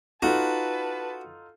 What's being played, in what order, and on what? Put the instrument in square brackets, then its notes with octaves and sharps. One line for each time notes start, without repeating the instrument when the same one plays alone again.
[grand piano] D#4 F4 A4 [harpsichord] F#4 [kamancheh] B4 A5